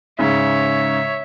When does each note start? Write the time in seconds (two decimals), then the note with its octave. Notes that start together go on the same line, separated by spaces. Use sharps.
0.19 G#2 C#3 C#5 E5